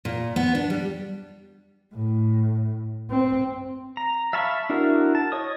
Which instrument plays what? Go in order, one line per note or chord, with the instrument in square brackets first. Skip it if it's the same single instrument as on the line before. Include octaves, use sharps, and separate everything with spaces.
[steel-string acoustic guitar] A#2
B3
D4
G3
[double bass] A2
C4
[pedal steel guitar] A#5
E5 F5 A5 B5 C#6
D4 E4 F#4 A#4
A5
C#5 D#5 D#6